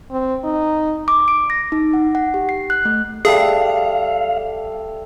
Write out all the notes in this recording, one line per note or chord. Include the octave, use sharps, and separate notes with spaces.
C4
D#4
D6
D7
A#6
D#4
F#5
F#5
G4
C7
F#6
A3
G3 G#4 A4 E5 F5